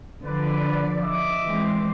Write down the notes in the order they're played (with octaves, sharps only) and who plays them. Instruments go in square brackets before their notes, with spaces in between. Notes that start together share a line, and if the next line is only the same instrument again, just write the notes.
[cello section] D3 F3 D5 [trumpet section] B4
[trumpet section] D#5 E5 D6
[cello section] E3 G#3 C4